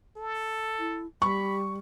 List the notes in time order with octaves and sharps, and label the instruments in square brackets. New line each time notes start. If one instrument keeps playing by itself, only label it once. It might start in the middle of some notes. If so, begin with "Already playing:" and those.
[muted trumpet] A4
[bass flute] E4
[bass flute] G3 [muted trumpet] B5 [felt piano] C#6